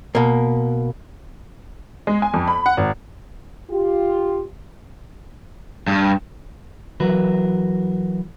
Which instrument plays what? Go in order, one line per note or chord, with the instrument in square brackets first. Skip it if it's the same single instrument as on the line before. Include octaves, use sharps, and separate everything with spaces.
[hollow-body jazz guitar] B2 A#3
[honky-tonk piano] G#3
G#5
F2
B5
F#5
G#1
[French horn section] F4 G4
[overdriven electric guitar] G2
[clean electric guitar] E3 F#3 F#4 A#4 B4